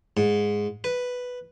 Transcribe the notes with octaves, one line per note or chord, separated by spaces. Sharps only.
G#2
B4